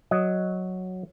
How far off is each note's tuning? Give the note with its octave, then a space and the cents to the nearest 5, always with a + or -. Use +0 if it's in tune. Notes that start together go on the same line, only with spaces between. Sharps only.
F#3 +0 D#5 +0